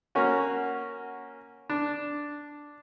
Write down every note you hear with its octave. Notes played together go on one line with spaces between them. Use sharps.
A#3 C#4 F#4
D4